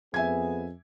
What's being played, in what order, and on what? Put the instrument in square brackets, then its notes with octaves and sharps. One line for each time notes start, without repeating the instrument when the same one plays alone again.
[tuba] F2 [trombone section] B3 G#4 [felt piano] E5 G#5 G#6